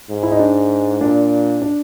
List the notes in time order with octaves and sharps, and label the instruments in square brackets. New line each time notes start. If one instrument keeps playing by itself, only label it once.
[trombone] G#2
[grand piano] E4
D#4
D4
[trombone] A#2 [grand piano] D4
[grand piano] D4